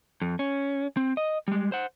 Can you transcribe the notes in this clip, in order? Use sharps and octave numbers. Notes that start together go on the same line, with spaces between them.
F2
C#4
C4
D#5
G3 G#3
C5 F#5